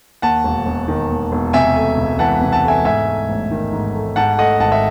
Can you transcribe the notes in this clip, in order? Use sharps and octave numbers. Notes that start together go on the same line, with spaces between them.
D#2 F#5 A5
E1
E1
D#3
D#2
E1
C3 E5 G#5
A3
C#2
E3 F#5 A5
C3
F#5 A5
A3 E5 G#5
G#2 E5 G#5
A3
A1
D#3
G#2
A3
G#2 F#5 A5
A3 D#5 F#5
G#1 F#5 A5
E5